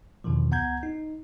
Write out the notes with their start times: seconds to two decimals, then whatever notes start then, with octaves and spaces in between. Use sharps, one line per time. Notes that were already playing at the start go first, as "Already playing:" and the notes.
0.24 E2 B2 D3 D#3 F3
0.51 C#2 B3 F#5 A#5 G6 G#6
0.83 D#4